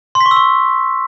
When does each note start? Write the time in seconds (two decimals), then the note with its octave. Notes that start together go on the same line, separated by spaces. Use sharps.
0.15 C6
0.21 B6
0.26 C#6
0.31 E6
0.37 C#6